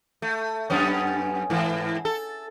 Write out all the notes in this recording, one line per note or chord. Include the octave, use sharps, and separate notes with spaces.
A3
F#2 B3 C#4
G#2 E3
A4